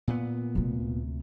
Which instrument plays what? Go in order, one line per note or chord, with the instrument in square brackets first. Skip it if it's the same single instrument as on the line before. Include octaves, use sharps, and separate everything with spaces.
[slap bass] A#2 B3
[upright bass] D2 C3